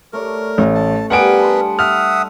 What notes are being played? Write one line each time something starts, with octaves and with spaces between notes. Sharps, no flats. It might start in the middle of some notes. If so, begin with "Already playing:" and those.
A3 A#4 C#5 D5
A1 C#6
A5
G3 B3 D4 A#4 B4 F#5 G#5 D7
A5 B5 C6
E5 F#5 D#6 F6